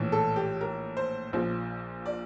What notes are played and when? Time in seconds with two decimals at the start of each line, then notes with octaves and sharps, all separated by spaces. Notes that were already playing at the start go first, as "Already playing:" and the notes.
Already playing: A#1 A2 E3
0.12 A4
0.36 G4
0.61 A#4
0.97 C5
1.33 A#1 A#2 F3 C5
2.06 D5